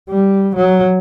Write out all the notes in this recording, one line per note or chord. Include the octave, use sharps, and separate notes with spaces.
G3
F#3